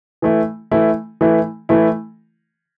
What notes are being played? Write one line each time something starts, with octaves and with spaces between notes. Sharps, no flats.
E3 A3 E4
E3 A3 E4
E3 A3 E4
E3 A3 E4